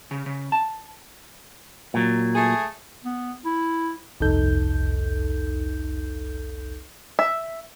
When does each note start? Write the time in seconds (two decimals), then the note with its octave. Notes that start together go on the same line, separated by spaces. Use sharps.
0.11 C#3
0.26 C#3
0.52 A5
1.94 A#2 F#3
2.35 A3 G#4
3.05 B3
3.45 E4
4.20 G1 C2 F2 D#4 A4 G6
7.19 E5